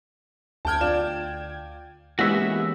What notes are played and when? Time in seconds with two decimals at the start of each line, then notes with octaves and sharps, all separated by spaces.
0.65 D2 G5 A5 F6 G#6
0.81 F4 D5 E7
2.19 E3 G#3 A#3 B3 C#4 F#4 G4 E5